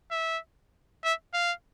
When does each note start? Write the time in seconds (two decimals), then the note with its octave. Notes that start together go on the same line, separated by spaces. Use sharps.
0.11 E5
1.04 E5
1.34 F5